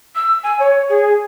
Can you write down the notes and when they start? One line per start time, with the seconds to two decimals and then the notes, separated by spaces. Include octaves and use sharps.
0.15 E6
0.44 G#5
0.59 C#5
0.89 G#4